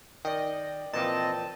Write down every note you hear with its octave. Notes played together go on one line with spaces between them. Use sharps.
D#3 D5 D#5 G5
A#2 E3 F3 C4 D#5 A5